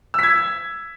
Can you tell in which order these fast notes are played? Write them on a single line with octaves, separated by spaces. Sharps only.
E6 B6 G#6